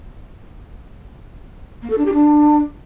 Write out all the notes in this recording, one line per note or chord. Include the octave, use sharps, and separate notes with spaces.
A#3
A4
D4
G4
D4